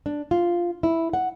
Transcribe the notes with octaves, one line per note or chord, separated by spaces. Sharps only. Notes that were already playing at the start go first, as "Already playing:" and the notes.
D4
F4
E4
F#5